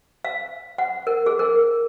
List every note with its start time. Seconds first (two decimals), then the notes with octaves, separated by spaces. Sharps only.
0.25 F5
0.78 F#5
1.07 A#4
1.26 G#4
1.39 A#4